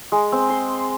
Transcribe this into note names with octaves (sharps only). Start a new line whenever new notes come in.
G#3
C4
C6